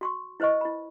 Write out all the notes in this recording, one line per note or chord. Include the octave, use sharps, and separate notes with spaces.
F#4 C6 C#6
E4 B4 C5 D#5 C#6
E4 B5